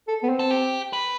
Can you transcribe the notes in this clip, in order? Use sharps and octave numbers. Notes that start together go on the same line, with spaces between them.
A4
B3
C4
A4
G4
B4